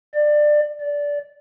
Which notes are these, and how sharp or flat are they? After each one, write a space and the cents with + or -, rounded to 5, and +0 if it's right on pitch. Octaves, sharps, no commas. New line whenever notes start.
D5 +20
D5 -15